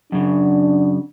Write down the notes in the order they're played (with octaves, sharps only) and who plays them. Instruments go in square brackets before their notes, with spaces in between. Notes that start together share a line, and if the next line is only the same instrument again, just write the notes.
[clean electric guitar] F#2 C#3 [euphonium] D4